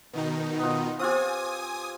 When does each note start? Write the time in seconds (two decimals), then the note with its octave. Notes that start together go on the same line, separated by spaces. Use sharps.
0.13 B2 D#3 D#4
0.59 B3 F4
0.99 C4 F4 G4 G#5 D#6